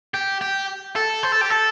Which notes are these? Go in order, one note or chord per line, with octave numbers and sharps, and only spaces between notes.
G4
G4
A4
C5
A4
G4
A4